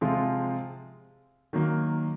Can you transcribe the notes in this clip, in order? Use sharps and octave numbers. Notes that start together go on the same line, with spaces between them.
C3 F3 G#3 C4 F4
D#3 F#3 A#3